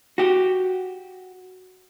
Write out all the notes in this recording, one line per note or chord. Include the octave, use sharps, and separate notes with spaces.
F#4 G4